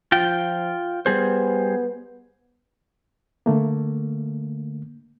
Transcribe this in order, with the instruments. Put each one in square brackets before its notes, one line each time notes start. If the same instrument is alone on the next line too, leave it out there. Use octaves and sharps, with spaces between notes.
[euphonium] F3 [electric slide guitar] F4 G5
[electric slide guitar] G3 G#4 C5 [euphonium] B3
[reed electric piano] D3 A3 A#3